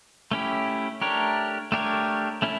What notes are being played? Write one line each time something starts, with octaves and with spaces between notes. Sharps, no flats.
A3 C#4 E4 G4
A3 D4 G4 A#4 C#5
A3 D4 G4 A#4 C#5
A3 C#4 E4